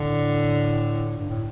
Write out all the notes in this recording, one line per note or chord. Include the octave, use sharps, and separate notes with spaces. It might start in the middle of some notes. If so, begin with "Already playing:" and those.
Already playing: A2 D3
G2
A2